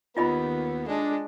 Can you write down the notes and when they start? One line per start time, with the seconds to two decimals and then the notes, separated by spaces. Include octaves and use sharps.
0.17 D#2 B3 F4 D#5 B5
0.88 G#3 D4